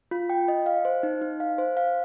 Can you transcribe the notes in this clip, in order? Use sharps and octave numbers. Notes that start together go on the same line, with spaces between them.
F4
G5
D#5
F5
C5
D#4
D#4
F5
C5
F5